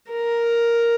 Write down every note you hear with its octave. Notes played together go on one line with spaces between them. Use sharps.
A#4